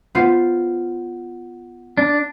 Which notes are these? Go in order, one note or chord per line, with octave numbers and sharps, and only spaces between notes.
B3 F4 C5
D4